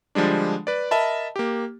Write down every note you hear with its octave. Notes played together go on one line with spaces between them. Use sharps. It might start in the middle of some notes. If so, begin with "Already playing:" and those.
D3 F3 G3 G#3 D4
B4 D5
A#4 D#5 E5 A5 B5
A#3 G4